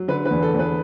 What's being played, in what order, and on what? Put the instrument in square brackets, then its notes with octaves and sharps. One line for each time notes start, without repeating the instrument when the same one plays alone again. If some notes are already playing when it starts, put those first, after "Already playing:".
Already playing: [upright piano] F#3
D3 B4
B4
E2
A4
E2 B4